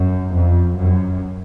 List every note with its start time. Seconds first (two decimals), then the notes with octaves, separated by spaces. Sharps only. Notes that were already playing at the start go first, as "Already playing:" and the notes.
Already playing: F#2
0.34 F2
0.78 F#2